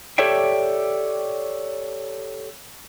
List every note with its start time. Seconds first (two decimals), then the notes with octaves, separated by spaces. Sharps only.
0.18 G4 A4 C#5 D5 E5 G5